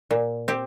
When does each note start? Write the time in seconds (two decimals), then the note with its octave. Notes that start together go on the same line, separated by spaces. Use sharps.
0.11 A#2
0.48 C4 G4